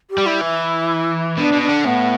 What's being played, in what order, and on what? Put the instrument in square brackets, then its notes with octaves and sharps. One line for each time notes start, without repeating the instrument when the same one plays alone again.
[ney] G4
[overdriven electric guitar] G3
[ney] E4
[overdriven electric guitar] E3
[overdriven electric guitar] B2 [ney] D4
[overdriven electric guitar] B2
[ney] D4
[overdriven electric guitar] D3
[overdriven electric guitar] A2 [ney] B3